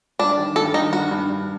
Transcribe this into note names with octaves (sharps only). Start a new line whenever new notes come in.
G2 D4
D#3
G2 A4
D#3 D#4
G2 F#4
G2
G2